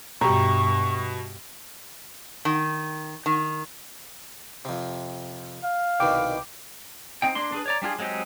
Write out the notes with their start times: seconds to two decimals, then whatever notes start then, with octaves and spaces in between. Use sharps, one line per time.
0.21 G2 B2 G4 E5 A#5 C#6
2.45 D#3
3.26 D#3
4.65 F2 C3
5.64 F5
6.00 C2 B2 D#3 G5 D6
7.22 C4 D#4 G5
7.35 A#3 D4 C6
7.52 D4 G#4 B4
7.66 C#5 D5 A#5
7.82 G3 D4 F4 G#4
7.99 F#3 G#3 C4 D#4 G4